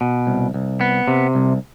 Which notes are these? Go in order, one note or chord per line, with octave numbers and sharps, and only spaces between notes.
B2
C2
C2
B3
C3
C2